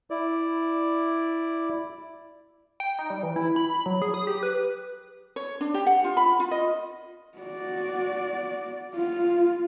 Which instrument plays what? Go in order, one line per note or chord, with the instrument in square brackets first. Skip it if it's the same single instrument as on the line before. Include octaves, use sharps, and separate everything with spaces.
[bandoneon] E4 D5
[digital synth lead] G5
D#4
G3
E3
E4
B5
B5
F#3
G#4
D#6
G4
B4
[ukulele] C#5
D4
G4
F#5
F4
B5
F4
D#5
[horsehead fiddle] F#4 D5
F4